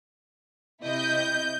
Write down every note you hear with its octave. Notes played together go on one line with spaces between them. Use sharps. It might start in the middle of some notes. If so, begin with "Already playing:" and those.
C3 E4 D#5 G6